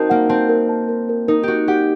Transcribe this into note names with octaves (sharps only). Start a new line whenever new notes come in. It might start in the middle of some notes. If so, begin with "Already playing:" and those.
Already playing: C4 D#4 F#4 A#4 A5
A#3 F#5
C4 A5
A#4
A5
A#4
A#4
D#4 A#4
F#4 G4 A#4
G4 F#5